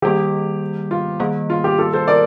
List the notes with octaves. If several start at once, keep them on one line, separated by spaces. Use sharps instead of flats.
D#3 G3 A#3 G4
F4
D#3 G3 A#3
F4
G4
F4 A4
A4 C5
A#4 D5